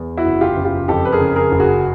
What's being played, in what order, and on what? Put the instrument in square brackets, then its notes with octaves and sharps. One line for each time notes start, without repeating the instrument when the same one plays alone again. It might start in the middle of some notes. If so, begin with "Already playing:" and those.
Already playing: [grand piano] E2
E4 F#4
F#1
F4 G4
F#1
F4 G4
F2 G4 A4
B4
G#4 A#4
C#3
G#4 A#4
F#1
F#4 G#4